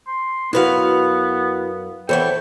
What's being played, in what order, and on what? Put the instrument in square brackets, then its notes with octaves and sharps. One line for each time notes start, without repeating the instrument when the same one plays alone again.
[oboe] C6
[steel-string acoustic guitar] F#2 B4 F5 [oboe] B3 [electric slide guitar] E4 F#4
[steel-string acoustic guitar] E2 E3 B3 [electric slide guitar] A4 C5 C#5 [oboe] G5